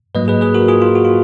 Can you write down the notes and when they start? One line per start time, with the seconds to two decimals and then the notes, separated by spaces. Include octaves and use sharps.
0.15 G#2 F#3 A#3 B4 D#5
0.28 G#4 B4
0.41 G#4 B4
0.54 F#4 A#4
0.68 F4 G#4
0.82 F4
0.95 F#4
1.04 F4